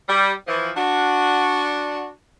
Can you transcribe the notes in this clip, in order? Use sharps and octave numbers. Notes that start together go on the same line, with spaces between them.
G3
E3 F3
D4 F#4